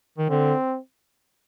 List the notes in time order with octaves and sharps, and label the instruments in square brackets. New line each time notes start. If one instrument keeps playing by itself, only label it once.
[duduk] D#3
[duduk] D3 [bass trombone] C4